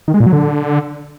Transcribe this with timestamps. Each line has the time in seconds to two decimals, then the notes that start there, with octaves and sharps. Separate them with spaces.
0.08 D#3
0.14 G#3
0.20 A#2
0.26 F#3
0.33 D3